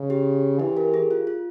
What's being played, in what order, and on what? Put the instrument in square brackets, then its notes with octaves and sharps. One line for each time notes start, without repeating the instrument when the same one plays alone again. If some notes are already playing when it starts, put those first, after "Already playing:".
Already playing: [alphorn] C#3
[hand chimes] G4
[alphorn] E3 [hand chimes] G4
[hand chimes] G4 A#4
G#4
F4
F4